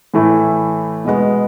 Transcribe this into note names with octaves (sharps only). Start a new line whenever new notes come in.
A2 E3 A3 E4
B2 G#3 B3